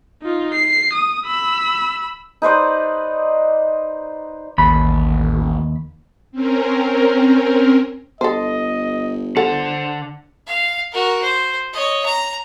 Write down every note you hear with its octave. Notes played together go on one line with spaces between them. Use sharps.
D#4 F4
C7
D#6
B5 E6
D#4 B4 C5 D5
A1 D#2 B5
C4 C#4 A#4
G1 A4 C5 D#5
D3 A4 C5 F#5
F5
F#4 A#4
C5
C#5 D#5
A#5